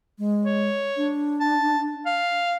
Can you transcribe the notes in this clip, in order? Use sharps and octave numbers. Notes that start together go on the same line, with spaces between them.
G#3
C#5
D4
A5
F5